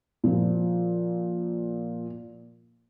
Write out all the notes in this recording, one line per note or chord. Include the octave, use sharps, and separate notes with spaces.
A#2 F3